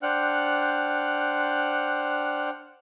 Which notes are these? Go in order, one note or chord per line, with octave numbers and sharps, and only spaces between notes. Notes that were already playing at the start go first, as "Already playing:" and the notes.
D4 C5 F#5 G5 F6 F#6